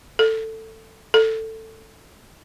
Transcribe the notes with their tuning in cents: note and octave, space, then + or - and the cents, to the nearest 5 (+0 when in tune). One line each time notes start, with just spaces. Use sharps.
A4 +15
A4 +15